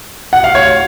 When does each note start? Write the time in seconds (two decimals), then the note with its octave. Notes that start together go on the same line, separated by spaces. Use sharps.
0.33 F#5
0.44 F5
0.55 C#5